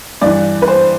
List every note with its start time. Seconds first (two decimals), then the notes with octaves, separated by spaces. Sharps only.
0.21 G2 E3 D5
0.62 B4
0.67 C5